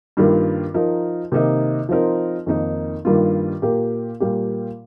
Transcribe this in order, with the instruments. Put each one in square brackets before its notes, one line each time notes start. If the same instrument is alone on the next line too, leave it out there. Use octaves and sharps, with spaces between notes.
[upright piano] G2 D#3 G3 A#3 F4
F3 D#4 A#4
C3 D#3 A#3 D#4 A#4
F3 C4 D#4 A#4
F2 D#3 A#3 D#4 A#4
G2 D#3 G3 A#3 F4
A#2 A#3 G4 A#4
A#2 G3 A#3 G4